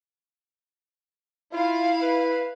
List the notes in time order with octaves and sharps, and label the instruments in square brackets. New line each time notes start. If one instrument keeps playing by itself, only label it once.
[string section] E4 F5 [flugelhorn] F4
[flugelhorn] B4